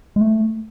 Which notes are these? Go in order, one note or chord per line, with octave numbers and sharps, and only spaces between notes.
G#3
A3